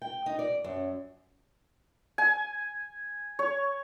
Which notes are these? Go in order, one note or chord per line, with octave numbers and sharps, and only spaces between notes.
G5
D#4
D5
F#2
G#5
C#5